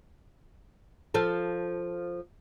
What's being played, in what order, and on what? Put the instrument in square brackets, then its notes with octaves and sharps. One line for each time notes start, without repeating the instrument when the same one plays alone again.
[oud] F3 A4